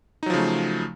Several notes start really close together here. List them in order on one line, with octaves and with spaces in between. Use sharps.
D#4 F#3 F3 C#3 A3